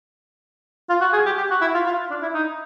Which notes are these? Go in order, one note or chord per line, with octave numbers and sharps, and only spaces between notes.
F4
F#4
G#4
G4
G4
F#4
E4
F4
F4
D4
E4
D#4